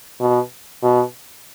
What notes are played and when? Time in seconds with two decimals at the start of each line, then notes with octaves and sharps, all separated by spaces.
0.20 B2
0.83 B2